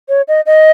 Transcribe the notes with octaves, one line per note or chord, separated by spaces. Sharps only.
C#5
D#5
D#5